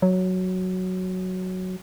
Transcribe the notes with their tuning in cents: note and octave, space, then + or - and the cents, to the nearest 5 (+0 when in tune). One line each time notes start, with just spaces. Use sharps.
F#3 +0